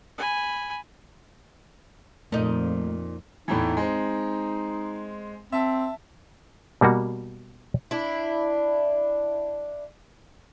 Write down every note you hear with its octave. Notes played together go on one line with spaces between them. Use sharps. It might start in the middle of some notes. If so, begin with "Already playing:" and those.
G#5 B5
F2 A#2 A3 D#4
E2 A2 E3 D#4
G#3 C4
C4 E5 A5
B2 G3 A#3 F#4
D4 E4